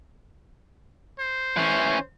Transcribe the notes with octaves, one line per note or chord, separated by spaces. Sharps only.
C5
E3 C#4